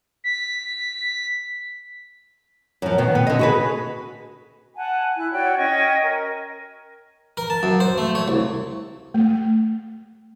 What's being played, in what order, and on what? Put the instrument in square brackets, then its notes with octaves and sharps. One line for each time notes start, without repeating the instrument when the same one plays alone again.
[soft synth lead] B6
[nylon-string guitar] F#2 F3
B2 D#3
B3
D3 D#5
F#4 G#4 B4
[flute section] F#5 G#5 A5
E4 F#6
F#4 C#5 D5 G5
C#4 D#5 G5 C#6
A#4
[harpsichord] A#4
A5
F#2
C5
A3
C#5
C2
[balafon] A3